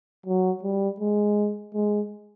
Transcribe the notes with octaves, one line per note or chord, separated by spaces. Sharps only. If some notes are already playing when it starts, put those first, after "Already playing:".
F#3
G3
G#3
G#3